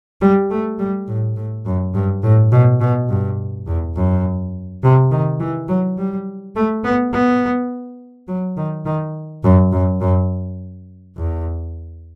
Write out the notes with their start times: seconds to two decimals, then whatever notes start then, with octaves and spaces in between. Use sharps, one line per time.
0.21 G3
0.50 A3
0.79 G3
1.07 A2
1.36 A2
1.66 F#2
1.94 G2
2.23 A2
2.52 B2
2.81 B2
3.09 G2
3.67 E2
3.95 F#2
4.83 C3
5.11 D#3
5.40 E3
5.68 F#3
5.98 G3
6.55 A3
6.84 B3
7.13 B3
8.28 F#3
8.57 D#3
8.86 D#3
9.43 F#2
9.72 F#2
10.01 F#2
11.17 E2